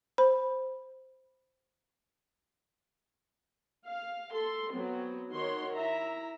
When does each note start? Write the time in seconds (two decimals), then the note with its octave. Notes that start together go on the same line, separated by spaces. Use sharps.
0.18 C5 B5
3.86 F5
4.32 A4 C6
4.70 F#3 B3 C4
5.30 D#3 F#4 C#5 C6
5.76 E4 E5 A#5